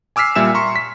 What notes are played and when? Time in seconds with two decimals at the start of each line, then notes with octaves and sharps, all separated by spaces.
0.16 G#5 D6 E6 F6 B6 C7
0.35 A#2 G3 E5 G#5 E6 E7
0.54 A#5 C6 C#6
0.76 B6